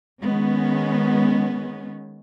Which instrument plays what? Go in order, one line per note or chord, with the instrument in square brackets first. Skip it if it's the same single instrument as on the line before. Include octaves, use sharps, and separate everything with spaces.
[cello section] D#3 G#3 B3 C#4